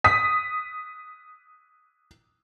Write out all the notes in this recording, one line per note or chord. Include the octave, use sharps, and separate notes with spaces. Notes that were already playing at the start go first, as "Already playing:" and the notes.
D#6 B6